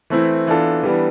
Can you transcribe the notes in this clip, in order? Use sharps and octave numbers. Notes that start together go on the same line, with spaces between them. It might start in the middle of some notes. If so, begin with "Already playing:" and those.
E3 A3 C4 E4
E3 B3 D4 F4 A4
E3 G3 B3 D4